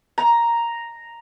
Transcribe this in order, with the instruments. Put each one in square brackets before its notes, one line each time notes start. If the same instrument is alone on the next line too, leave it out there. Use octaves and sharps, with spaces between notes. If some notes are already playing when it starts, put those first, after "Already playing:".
[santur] A#5